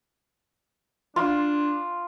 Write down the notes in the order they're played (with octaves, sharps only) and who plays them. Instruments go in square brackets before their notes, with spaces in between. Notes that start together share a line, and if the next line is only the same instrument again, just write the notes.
[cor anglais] D4 [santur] F4